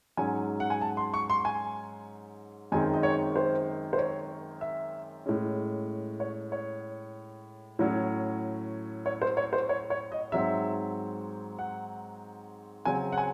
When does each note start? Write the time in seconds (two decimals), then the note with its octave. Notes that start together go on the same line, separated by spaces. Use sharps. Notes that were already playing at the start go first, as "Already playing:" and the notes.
0.17 G#2 F#3 C#4 G#5
0.60 F#5
0.70 G#5
0.81 A5
0.97 C6
1.14 C#6
1.30 C6
1.45 G#5
2.72 F#2 D#3 G#3 C4 G#5
2.94 D#5
3.03 C#5
3.36 C5
3.93 C5
3.98 C#5
4.61 E5
5.26 A2 G#3 C#4
6.20 C#5
6.52 C#5
7.79 A2 F#3 C#4
9.06 C#5
9.22 C5
9.37 C#5
9.53 C5
9.69 C#5
9.90 C#5
10.12 D#5
10.32 G#2 F#3 C4 E5
11.59 F#5
12.85 C#3 F#3 C4 G#5
13.12 F#5
13.18 G#5